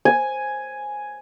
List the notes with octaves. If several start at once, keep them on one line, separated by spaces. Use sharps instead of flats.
G#5